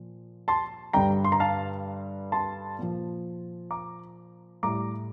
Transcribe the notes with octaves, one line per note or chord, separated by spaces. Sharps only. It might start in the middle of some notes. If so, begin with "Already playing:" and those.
Already playing: A#2 F3
A5 C6
G2 D3 G3 G5 A#5
C6
A#5
F5 A5
A5 C6
A#2 F3
A#5 D6
A2 G3 A#5 D6